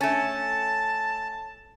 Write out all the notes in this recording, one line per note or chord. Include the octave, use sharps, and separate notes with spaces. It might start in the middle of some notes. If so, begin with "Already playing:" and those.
A3 C#4 A5